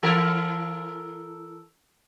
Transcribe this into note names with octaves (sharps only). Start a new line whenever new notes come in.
E3 A4 A#4